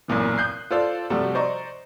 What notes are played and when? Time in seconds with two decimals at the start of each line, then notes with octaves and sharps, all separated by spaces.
0.08 B1 F#2 A#2 E3
0.38 D#6 F#6 G6 C7
0.71 F4 A4 C5 D5 F5
1.10 C3 F3 G3 A3 F#4 A4
1.35 C5 D5 D#5 A#5 C#6